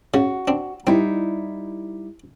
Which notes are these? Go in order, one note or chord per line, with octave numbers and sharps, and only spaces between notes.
C#3 F#4
C4 D4
G3 C4 D#4 E4